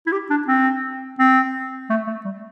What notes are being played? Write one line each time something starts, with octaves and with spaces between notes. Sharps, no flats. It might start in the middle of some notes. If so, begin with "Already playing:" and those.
E4
G4
D4
C4
C4
A3
A3
G3